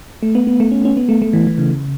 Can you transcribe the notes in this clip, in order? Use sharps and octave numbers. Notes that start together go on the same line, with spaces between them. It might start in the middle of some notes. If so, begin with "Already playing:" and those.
A3
B3
B3
A3
C#4
C#4
B3
A3
A3
E3
E3
C#3